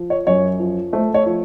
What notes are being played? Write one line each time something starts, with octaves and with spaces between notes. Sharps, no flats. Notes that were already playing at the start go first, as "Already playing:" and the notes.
Already playing: F3
C#5
F#2 C#5
F3
A3 C5
C#5
F3